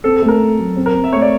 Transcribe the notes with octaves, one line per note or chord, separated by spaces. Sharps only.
C4 A4
A4
A3
A#4
C4
F#3
C4
A#4
C4
E5
A3 C#5
D5